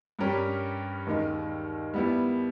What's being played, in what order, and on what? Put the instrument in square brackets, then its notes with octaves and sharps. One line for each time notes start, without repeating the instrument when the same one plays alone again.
[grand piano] G2 G3 C#4 G4 A#4
D#2 D#3 G#3
G3 B3 E4